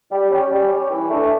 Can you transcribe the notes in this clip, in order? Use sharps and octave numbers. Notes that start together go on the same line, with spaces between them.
G3
C#4 G4
G3
C#4 G4
E3
A3 D4